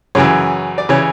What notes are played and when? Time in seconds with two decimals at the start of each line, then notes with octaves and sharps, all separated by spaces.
0.15 F#2 C#3 E3 C#5
0.78 D5
0.89 C#3 E3 C#5